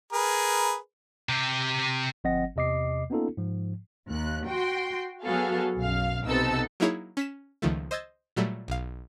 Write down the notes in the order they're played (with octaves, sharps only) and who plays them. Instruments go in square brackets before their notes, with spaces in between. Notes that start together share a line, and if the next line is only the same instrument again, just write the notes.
[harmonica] G#4 A#4 B4
[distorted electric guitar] C3 G4
[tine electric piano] G1 F3 C4 D#5 F#5 A#6
E2 C3 D#5 D6 C7
A#3 B3 C#4 D#4 F4 A4
G#2 F3
[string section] D#2 F#6
F#4 G5 C6
F#3 B3 F#4 G#4 A4 F5
B1 F#2 F5
B1 C3 B3 D#4 A4 E6
[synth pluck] F#3 A#3 D#4 E4 G#4 C#5
C#4 B6 E7
C#2 D#3 F3 A3
C5 D#5 E6 G#6 A6
A#2 F#3 G3 A3
B1 F5